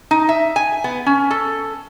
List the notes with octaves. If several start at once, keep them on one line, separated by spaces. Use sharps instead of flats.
D#4
E5
G#5
B3
C#4
A4